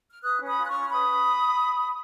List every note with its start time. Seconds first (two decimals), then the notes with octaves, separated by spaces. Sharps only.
0.12 F6
0.23 B4 D#6 F#6
0.40 C#4
0.46 B5 D#6
0.58 F4
0.64 F#6
0.69 C#6 F6
0.75 C#4
0.84 F6
0.92 B4 B5 D#6